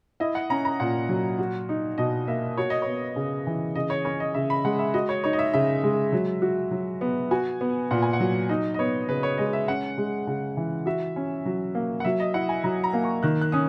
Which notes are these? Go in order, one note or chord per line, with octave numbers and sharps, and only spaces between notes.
E4 D#5
F#5
C#4 A#5
A#5
A#2 F#5
F#3
F#4
D#4
B2 D#5
A#3 E5
F#4 C#5
D#5
B3 C#5
C#3
E3
C#3 D#5
C#5
C#4 C#5
D#5
C#3 E5
B5
G#3 F#5
E5
F#4 D#5
C#5
D#4 C#5
D#5
E5
C#3 E5
G#3
F#3
F#4
F#3
B3
F#4 G#5
B3
A#2 F#5
G#5
F#5
F#3
D#4 D#5
D#5
B3 C#5
C#3 B4
C#5
G#3 D#5
E5
C#4 F#5
G#3
C#3
E3
F#4 E5
C#4
F#3
A#3
F#5
F#3 E5
D#5
E4 F#5
G#5
F#3 A#5
A#5
A#3
C#6
D#3 F#6
F#6
C#4 D#6